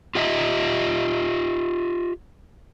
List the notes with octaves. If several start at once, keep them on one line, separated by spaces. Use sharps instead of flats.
F4 G4 D#5 E5